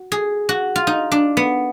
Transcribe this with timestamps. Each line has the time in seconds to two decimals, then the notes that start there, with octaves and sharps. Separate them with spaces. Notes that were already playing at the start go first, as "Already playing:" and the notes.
Already playing: F#4
0.12 G#4
0.49 F#4
0.76 F4
0.87 D#4
1.12 D4
1.37 B3